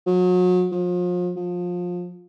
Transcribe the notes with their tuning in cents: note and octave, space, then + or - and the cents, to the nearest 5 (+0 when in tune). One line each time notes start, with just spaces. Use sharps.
F#3 -35
F3 +35
F3 +25